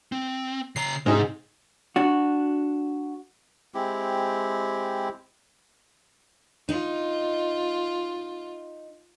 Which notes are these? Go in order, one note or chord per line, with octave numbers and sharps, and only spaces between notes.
C4
C#3 A#5 C7
G#2 C3 C4 D#4 G#4
D4 F#4
G#3 C4 E4 G4
D#4 F4